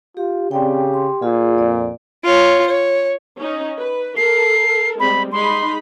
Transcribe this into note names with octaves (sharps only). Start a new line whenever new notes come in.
F4 G4
C#3 C4 G4 D5 G5
C6
A#2 F4 G#4
F2 D5
F4 C#5
C#5
C#4 D#4
B4
A4 A#4 C7
G3 G#3 C4 B5
G#3 D#4 B5 C6